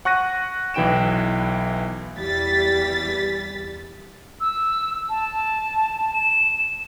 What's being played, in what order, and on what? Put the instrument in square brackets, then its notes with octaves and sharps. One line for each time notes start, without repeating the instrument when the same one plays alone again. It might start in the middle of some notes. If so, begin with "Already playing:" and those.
[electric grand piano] F#5 C#6 F#6 A#6 D#7
B1 E3 E4 G5 D7 E7
[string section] E2 E3 G3 A6 B6
[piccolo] E6
A5
E7